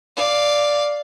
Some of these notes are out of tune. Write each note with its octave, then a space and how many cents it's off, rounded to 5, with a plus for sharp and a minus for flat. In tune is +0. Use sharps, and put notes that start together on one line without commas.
D5 +0 F5 +0